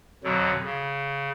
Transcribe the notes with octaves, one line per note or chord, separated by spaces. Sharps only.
F2 B2 D3 F#3
C#3